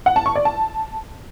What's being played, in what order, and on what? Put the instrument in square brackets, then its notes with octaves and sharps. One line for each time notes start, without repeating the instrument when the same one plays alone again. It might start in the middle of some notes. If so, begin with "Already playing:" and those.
[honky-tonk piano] F#5
A5
C#6
D5
A5